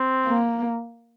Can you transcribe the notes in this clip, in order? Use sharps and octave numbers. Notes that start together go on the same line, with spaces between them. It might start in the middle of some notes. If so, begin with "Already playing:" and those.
Already playing: C4
A#3